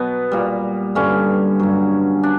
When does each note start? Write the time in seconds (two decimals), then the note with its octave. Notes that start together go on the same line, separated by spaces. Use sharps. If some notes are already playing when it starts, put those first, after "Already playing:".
Already playing: B2 F#3 B3
0.32 A#2 G3
0.95 G2 D3 G3 C#4
1.59 G2 F#3
2.23 D4